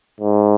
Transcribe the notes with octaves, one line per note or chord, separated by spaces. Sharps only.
G#2